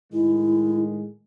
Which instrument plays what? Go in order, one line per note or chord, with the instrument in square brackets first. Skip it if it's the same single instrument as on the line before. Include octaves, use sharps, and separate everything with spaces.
[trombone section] A2 D#3 G#3 [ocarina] E4